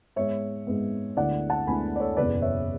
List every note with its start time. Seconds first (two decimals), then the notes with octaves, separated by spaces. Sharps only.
0.16 G#2 G#3 B3 C#5 E5
0.67 G#2 G#3 B3
1.17 D2 D3 G#3 B3 E4 D5 F#5
1.50 F#5 A5
1.67 D2 D3 G#3 B3 E4 G#5 B5
1.96 D5
2.00 A4 C#5
2.17 F#1 E2 B2 B4 D5
2.42 C#5 E5